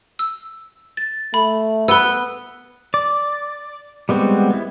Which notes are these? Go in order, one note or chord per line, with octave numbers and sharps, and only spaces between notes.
E6
A6
A3 B5
B3 B4 E6 G7
D5
G3 G#3 B3 C4 F#4
B3 E4